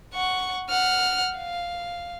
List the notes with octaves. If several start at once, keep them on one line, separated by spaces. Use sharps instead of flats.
F#5 C#6
F#5 F6
F5